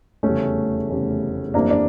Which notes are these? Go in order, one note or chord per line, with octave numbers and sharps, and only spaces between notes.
F1 E2 C#3 G3 A3 C#4
F1 E2 C#3 G3
G1 F2 E3 G3 A#3 D4
D4